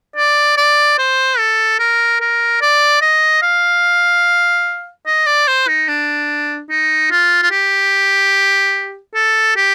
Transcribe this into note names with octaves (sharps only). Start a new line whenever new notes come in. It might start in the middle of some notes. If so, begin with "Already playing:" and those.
D5
D5
C5
A4
A#4
A#4
D5
D#5
F5
D#5
D5
C5
D#4
D4
D#4
F4
F4
G4
A4
G4